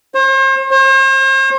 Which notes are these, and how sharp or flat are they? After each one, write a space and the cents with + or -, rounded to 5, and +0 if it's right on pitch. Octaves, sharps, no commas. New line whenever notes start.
C5 +40
C5 +45